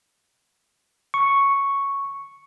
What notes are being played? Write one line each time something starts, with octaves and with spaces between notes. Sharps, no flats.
C#6